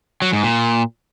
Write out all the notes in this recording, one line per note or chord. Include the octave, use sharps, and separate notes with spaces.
F#3
G#2
A#2